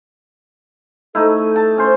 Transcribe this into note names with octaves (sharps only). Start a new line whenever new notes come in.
A3 D#4 E4 A4
A5
C#4 C5